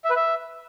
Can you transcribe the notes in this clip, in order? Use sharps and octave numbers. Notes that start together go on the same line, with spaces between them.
E5
B4
E5